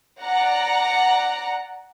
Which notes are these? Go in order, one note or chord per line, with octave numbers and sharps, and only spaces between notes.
D5 F#5 A#5